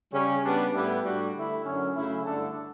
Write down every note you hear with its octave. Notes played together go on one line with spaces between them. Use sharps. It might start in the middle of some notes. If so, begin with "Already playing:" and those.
C#3 G3 C#4
C#3 G3 B3 D4
A2 G3 B3 E4 G4
A2 G3 D4 F#4
D3 A3 E4
F#2 D3 F#3 C#4
C#3 F#3 A3 C#4 E4
G2 D3 A3 D4 A4